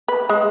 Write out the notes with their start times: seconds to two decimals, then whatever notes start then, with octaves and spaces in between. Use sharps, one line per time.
0.08 B4
0.29 G#3